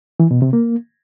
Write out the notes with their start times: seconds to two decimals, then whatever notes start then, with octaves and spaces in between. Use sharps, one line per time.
0.20 E3
0.31 B2
0.42 C3
0.53 A#3